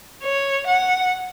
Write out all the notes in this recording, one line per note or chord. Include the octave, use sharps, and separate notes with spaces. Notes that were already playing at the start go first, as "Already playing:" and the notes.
C#5
F#5